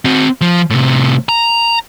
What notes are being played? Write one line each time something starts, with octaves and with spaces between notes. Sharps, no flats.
C4 F#4
F3
A2 C3
A#5